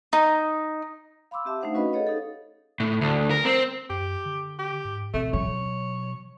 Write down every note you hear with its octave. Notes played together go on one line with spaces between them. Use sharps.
D#4
F5 B5 C6 D6 E6
C4 G4 E5 A5
A3 D4 D#4 C5 F5 F#5
C#4 F#4 B4 D#5 F5 B5
G#4 A4 C#5 D#5 F5 F#5
D#4 G4 A4 C5
A2
D2
A#4
C4
F#2 G4
D3
G4
G#2
B2 A3 C4
F#3 C#5